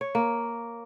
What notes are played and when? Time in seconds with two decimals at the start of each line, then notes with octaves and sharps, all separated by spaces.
0.01 C#5
0.15 A#3